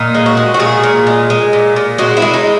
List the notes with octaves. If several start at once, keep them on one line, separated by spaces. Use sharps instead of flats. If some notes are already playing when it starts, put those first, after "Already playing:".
Already playing: A#2 D#4
G#3
F#4
G#3
F#4
A#2 G#4
A#2
G#3
G#3
A#2
A#2
G#3 F#4
E4
G#3
D#4